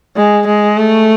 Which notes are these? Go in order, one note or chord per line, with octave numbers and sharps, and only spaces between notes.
G#3
G#3
A3